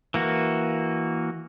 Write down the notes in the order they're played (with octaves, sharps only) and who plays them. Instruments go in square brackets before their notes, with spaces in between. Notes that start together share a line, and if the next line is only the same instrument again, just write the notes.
[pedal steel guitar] E3 A#3 F#4